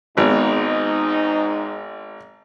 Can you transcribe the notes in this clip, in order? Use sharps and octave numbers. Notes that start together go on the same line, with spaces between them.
G#1 G#2 B3 D#4